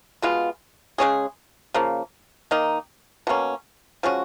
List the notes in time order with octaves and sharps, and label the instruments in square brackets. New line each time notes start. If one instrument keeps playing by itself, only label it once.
[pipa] B2 G#3 B3 F4
C#3 G#3 C#4 G#4
C#3 F3 A#3
D#3 A#3 D#4
B2 A#3 C#4
F3 G#3 C#4 F#4